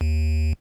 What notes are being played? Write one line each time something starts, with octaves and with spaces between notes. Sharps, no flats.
D#2